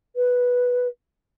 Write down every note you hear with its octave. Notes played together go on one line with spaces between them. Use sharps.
B4